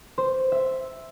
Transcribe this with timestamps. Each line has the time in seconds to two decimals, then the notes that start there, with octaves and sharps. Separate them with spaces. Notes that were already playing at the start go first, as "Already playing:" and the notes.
0.18 C5
0.52 E5